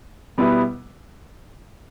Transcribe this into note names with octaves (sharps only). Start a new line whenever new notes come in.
B2 G3 B3 E4 B4